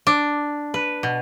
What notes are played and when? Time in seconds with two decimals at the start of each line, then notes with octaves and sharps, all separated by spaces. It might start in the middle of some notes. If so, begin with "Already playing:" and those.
0.07 D4
0.74 B4
1.03 B2